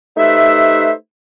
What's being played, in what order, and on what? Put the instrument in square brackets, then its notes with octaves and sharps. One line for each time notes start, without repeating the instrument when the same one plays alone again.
[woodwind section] A3 D#4 G4 B4 C5 E5